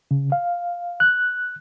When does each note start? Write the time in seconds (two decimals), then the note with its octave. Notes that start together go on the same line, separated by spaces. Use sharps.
0.11 C#3
0.32 F5
1.00 F#6